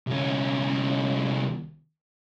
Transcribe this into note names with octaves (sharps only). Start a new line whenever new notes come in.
C2 C#4